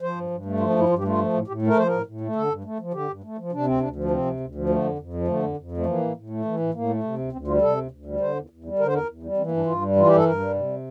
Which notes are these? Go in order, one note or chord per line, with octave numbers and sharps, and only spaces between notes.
F3 C5
G2
G2
A3
F3 F4
D4
G2
E4
G2 F4
G4
A3 F4
F3
A2
A2 G4
A3
A#4
F3 C5
A2 A#4
A2
A3
D3 A4
G2
A3
F3
D3 G4
G2
A3
F3
C3 D4
D2 C4
D2 D4
F3
D4
C3 C4
D2
D2
F3
D3 A3
F2
F2
F3
D3 A3
F2
F2
F3
A3
E3 A#3
A2
A2
A3
E3
A2
A2 A#3
A3
C3
D2
D2 C4
G3 F4
C3 A4
D2
D2
G3
D3 C5
E2
E2
G3
D3 A#4
C5
E2 A#4
E2
G3
E3 C4
A#3
G2
D4
G2 F4
G3
E3 F4
G2 G4
A4
G2 A#4
G3
C3